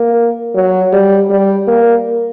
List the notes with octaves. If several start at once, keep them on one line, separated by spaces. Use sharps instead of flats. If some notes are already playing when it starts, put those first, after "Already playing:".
Already playing: A#3
F#3
G3
G3
A#3